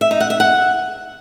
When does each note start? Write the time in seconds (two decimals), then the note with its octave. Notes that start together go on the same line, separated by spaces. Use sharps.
0.01 E5
0.11 D#4
0.20 F#5
0.30 E5
0.40 F#5